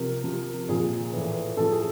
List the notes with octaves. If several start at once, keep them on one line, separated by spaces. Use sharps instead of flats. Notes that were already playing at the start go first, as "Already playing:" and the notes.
Already playing: C3 F3 A#4
C3 F3
A#2 F3 G#4
A2 E3
A2 F3 A4
G#4